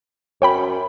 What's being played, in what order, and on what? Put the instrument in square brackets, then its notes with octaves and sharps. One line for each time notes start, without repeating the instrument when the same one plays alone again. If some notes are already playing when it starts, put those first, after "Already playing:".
[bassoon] F#2 [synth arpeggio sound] C#5 G5 B5